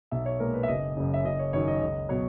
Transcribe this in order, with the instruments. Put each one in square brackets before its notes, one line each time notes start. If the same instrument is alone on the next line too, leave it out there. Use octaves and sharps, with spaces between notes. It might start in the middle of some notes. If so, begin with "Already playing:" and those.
[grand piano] B1 E5
C#5
A#2 G#3 A#4
B4
E5
F#1 D#5
F#2 C#3
E5
F#1 D#5
C#5
F#2 D#3 F#3 C#5
D#5
C#2 D#5
B2 F#3 C#5